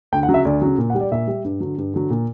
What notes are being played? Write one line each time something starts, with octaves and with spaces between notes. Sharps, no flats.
D2 G5
F#5
C#3 F#3
E5
D2 D5
C#3 F#3
A#2
F#5
G3
D5
A#2 E5
G3
G2
D3 F#3
G2
D3 F#3
A#2